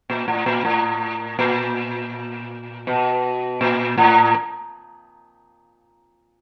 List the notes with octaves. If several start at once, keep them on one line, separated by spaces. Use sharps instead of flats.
A#2
A2
A#2
A2
A#2
B2
A#2
A2